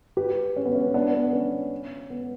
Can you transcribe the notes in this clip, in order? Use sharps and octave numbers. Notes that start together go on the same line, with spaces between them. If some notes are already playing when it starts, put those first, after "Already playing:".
G4 B4
C#4
B3
C#4
B3 D4
B3
C#4
B3